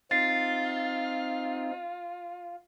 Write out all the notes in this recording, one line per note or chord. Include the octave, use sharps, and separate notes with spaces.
C4 D#4 F4 A6 C7